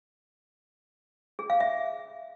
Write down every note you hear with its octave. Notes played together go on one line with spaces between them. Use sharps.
G#4
F5
E5